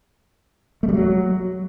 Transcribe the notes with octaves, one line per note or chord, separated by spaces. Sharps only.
A3
G3
F#3